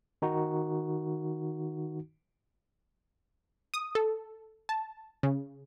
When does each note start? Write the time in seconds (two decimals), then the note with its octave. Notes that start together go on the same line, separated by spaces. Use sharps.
0.22 D#3 D#4 F#4
3.74 D#6
3.95 A4
4.69 A5
5.23 C#3